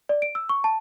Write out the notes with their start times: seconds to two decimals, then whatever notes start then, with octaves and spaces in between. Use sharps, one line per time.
0.09 D5
0.22 D7
0.35 E6
0.49 C#6
0.64 A5